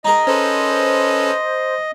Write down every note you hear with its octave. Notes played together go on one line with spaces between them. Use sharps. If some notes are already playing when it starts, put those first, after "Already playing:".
D#4 G#4 A#4 D#5
C#4 A4 B4 C5